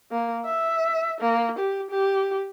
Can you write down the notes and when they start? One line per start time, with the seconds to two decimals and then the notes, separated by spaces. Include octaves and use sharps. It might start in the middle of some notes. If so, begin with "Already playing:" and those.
0.11 A#3
0.45 E5
1.21 A#3
1.59 G4
1.90 G4